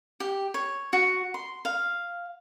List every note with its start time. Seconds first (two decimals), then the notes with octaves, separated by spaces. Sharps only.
0.20 G4
0.54 C#5
0.93 F#4
1.34 C6
1.65 F5